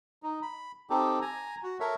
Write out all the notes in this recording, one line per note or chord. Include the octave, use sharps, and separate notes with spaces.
D#4
B5
C4 D#4 G4 A4
G#5 A#5
F#4
A4 A#4 C#5 E5